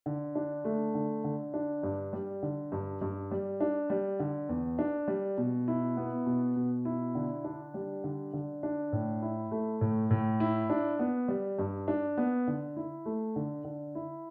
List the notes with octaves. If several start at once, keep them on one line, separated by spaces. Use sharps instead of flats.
D3
D4
A3
D3
D3
D4
G2
G3
D3
G2
G2
G3
D4
G3
D3
E2
D4
G3
B2
E4
B3
B2
B2
E4
D3
D4
G3
D3
D3
D4
A2
E4
A3
A2
A2
E4
D4
B3
G3
G2
D4
B3
D3
E4
A3
D3
D3
E4